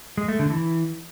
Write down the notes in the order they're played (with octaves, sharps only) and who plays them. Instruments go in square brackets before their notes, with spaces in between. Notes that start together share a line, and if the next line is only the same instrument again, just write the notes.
[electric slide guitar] G#3
A3
D3
E3